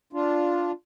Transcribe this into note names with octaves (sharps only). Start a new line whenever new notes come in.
D4 F4